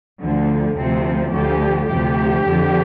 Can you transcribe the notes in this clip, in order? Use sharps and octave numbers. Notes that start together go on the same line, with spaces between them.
D2 D3 F3
D2 C3 F3 C4
D2 D3 F3 G4
D2 C3 F3 G4
F2 D3 F3